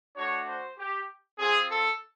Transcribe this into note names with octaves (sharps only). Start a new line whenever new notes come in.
A3 D4 F#4 C#5
C5
G4
C4 F4 G#4
A4